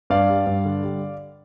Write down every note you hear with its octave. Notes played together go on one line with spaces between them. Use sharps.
G2 D5 F5
G3
G2
D3
G3